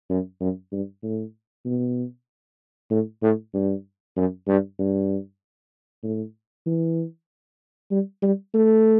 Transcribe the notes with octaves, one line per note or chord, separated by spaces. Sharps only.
F#2
F#2
G2
A2
B2
A2
A2
G2
F#2
G2
G2
A2
E3
G3
G3
A3